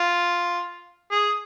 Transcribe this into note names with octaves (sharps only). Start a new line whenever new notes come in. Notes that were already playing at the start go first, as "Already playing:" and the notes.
Already playing: F4
G#4